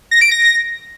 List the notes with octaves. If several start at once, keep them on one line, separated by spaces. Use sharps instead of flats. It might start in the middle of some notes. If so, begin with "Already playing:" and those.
A#6
D7
A#6